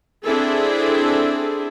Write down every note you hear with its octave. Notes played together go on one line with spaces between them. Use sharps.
C4 D4 E4 G#4 A4